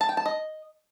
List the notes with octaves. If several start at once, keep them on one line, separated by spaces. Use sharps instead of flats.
A5
G5
A5
D#5